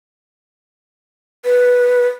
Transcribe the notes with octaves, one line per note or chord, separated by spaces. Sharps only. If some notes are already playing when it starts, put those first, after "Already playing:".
B4